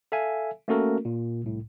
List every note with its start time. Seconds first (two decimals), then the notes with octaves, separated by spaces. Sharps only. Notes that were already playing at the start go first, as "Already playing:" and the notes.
0.12 A4 E5 F5 G#5
0.68 A3 A#3 C#4 F#4 A4 A#4
1.05 A#2
1.43 C2 A2